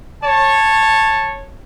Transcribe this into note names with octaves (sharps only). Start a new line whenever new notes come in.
C#5 A5